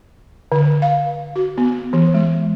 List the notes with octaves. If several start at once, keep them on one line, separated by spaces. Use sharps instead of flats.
D3
F5
F#4
B3
E3
G#3